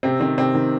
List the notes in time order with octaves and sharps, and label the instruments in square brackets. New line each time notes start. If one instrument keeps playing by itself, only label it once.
[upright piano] C3 C4
D#3 C4
C3 C4
D#3